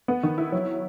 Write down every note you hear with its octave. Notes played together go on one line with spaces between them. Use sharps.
B3
D#3
E4
F#3